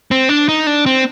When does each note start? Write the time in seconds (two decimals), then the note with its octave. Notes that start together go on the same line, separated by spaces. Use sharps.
0.11 C4
0.29 D4
0.49 D#4
0.67 D4
0.86 C4